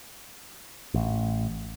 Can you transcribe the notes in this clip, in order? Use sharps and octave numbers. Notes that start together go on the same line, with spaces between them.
A1